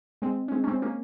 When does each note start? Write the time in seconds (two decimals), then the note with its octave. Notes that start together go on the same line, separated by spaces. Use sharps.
0.22 G#3 C4
0.48 C#4
0.52 G#3 C4
0.64 C#4
0.67 G#3 C4
0.82 A#3 C#4